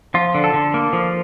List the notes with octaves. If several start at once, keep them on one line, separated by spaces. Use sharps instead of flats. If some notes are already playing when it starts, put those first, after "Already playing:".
F3 F4
D3
A4
D3
A#3
F3